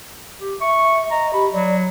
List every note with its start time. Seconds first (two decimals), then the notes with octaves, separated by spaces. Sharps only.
0.41 G4
0.61 E5 C#6
1.11 D#5 A#5
1.33 G4 B5
1.53 F#3 D5